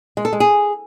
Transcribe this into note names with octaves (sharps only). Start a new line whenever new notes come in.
G#3
A4
G#3
G#4